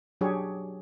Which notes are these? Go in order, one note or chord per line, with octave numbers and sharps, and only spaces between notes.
F#3 D4 G4 G#4 C#5